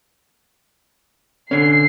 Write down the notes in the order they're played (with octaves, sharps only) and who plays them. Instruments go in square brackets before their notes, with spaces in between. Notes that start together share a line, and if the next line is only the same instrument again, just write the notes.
[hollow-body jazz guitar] D3 C#4 [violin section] C7